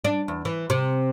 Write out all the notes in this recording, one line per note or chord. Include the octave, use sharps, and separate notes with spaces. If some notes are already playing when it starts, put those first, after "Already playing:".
D4
E2
E3
C3